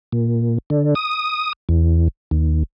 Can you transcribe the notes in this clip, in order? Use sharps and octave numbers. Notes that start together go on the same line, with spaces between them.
A#2
D3
D#6
E2
D#2